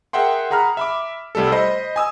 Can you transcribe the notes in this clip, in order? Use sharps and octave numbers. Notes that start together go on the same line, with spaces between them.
G#4 A#4 E5 F#5 G5 C6
G#4 F#5 A#5 B5 F6
E5 B5 D6
C2 G3 A3 A4
C5 D#5 B5
G#5 D#6 E6